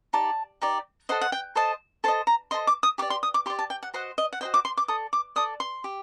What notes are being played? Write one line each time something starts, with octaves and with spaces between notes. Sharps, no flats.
D#4 G4 D5 A5
D#4 G4 D5
A4 C5 D#5 F#5
F#5
G5
A4 C5 D#5 A5
A4 C5 D#5 A5
A#5
A4 C5 D#5 C6
D6
D#6
G4 D5 D6
C6
D#6
D6
G4 D5 C6
A5
G5
F#5
F#4 C5 D#5 F#5
D#5
F#5
F#4 C5 D#5 G5
D6
C6
D6
A4 D5 D#6
D6
A4 D5 D#6
C6
G4